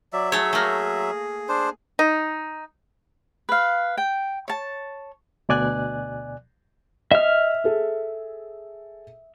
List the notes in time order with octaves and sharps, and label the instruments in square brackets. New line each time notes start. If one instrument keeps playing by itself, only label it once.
[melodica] F#3 E5 [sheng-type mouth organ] D5
[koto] A3 C#5 [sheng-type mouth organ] G#4
[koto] A3 A#3
[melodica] D4 C5
[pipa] D#4
[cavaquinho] B4 F5
G5
C#5 A5
[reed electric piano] D2 B2 D5 G#5 F#6
[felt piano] D#5 [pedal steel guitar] E5 F6
[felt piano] G#4 A4